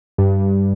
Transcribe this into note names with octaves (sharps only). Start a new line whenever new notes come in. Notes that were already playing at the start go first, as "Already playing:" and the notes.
G2